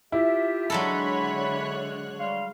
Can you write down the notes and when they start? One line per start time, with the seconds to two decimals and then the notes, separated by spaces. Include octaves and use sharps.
0.12 E4 F4 G4 E5
0.70 D3 F#3 G#3 A4 C#5 B5 F#6
2.20 G3 F5 C6